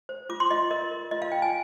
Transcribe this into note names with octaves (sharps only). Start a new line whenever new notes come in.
C5
F4 D6
C6
F4 D#5
A#4 D#5
A#4
F4 D#5
F5
F4 G5
G#5